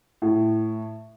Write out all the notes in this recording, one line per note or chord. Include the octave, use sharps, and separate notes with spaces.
A2